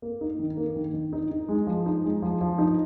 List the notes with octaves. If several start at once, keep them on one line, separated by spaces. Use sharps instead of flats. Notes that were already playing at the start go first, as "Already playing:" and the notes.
A#3
D#4
D#3
A#3
D#3
D#3
D#4
D#4
G#3
F3
D#4
G#3
F3
F3
D#4